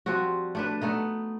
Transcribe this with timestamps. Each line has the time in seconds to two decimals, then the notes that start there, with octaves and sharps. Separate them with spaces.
0.06 F3 G3 C4 F#4
0.55 A3 D4 B4
0.81 A3 B3 D#4